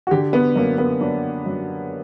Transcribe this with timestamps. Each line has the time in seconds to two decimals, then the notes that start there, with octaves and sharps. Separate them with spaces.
0.07 F#4
0.11 D3 G4
0.33 B3
0.56 F#2 A#3
0.78 B3
1.00 F#2 D4
1.46 F#2